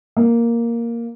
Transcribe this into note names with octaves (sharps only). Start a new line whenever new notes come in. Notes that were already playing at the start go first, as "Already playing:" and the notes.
A#3